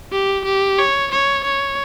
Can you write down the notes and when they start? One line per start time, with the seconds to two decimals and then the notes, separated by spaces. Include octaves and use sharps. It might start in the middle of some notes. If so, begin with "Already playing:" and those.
0.12 G4
0.45 G4
0.79 C#5
1.11 C#5
1.44 C#5